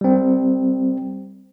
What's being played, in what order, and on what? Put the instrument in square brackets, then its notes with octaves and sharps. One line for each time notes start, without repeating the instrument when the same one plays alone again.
[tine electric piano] G3 C4